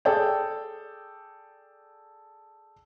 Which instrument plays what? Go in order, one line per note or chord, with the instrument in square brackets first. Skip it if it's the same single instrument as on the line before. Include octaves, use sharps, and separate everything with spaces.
[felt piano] G#4 A4 D5 G5